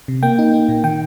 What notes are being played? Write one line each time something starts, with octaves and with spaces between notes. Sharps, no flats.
C3
A#3 G5
D#4
A#3
A#2
D#3 G5